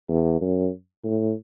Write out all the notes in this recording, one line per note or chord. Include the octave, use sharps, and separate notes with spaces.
E2
F#2
A2